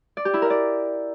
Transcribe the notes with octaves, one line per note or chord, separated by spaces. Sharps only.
D5
G4
E4
A#4
D5